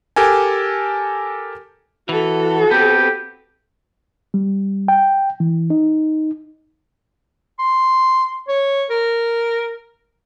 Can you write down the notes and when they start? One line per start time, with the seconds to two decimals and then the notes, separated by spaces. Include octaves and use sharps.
0.16 G4 A4 A#4 G#5
2.09 E3 F#4 A4
2.71 B3 C4 G4
4.34 G3
4.88 G5
5.40 E3
5.70 D#4
7.59 C6
8.48 C#5
8.90 A#4